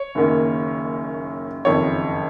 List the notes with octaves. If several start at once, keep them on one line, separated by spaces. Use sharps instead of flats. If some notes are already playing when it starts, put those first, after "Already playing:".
Already playing: C#5
F#1 F#2 D#3 A#3
F#1 F2 D#3 C#5